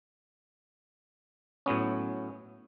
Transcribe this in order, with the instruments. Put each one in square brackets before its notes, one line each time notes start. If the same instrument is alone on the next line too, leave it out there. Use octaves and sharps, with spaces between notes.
[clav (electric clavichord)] A2 F#3 B3 C#4